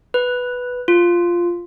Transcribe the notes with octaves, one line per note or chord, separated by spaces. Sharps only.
B4
F4